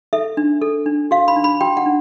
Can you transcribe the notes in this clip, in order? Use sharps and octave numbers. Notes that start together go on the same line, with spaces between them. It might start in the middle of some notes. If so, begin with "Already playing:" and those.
A4 E5
D4
A4
D4
F#4 F5
B5
D4
B5
F#4 G5
F#5
D4